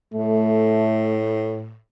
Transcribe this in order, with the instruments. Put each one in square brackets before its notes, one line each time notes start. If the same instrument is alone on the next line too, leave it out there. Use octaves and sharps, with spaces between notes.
[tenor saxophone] A2 [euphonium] A3